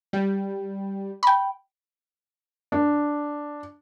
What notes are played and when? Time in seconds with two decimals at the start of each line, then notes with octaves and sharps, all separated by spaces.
0.13 G3
1.23 G5 B5
2.72 D4